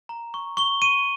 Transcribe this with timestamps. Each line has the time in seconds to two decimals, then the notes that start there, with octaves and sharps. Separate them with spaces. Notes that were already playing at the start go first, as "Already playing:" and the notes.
0.09 A#5
0.34 C#6
0.57 C#6 G7
0.82 C#6 D#7